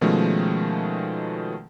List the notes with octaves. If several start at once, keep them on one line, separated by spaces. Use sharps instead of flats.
B2 D#3 F3 G#3 A3 C#4